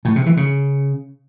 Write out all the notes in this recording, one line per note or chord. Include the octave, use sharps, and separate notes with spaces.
A2
C3
E3
C#3